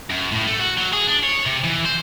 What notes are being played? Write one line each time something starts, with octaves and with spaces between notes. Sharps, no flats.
F#2
A2
A3
F#4
F#3
G#4
D4
C#5
C3
E3
C5